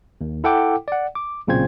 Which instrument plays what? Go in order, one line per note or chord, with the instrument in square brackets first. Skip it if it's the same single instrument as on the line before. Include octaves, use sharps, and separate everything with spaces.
[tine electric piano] D#2
E4 A4 F#5 G5 D6
D5 F#5
D6
B1 A#2 C#3 C4 C5 G#6